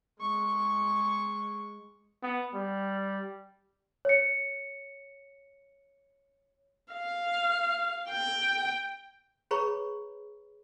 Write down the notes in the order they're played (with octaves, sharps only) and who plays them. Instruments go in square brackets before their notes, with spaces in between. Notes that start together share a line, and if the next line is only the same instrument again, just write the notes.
[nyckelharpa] G#3 C#6
[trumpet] B3
G3
[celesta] C#5 C#7
[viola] F5
G5
[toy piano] G#4 B4 C#5 A#5 B5 C#6